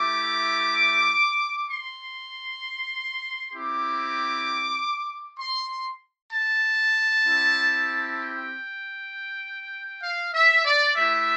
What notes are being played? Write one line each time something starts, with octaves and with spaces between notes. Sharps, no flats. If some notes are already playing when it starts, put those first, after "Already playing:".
Already playing: A3 E4 G4 D6
C6
C4 E4 G4 D6
C6
A5
C4 E4 G4
G5
F5
E5
D5
A3 E4 G4 E5